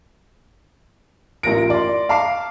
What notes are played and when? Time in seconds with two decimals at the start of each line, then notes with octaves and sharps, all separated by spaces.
1.43 A1 F4 A#4 A#6 D7
1.70 D5 C6
2.09 F5 A5 A#5 D6 C7